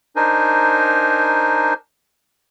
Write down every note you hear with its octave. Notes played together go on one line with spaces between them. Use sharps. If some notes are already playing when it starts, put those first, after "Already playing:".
D4 D#4 A#4 C5 G#5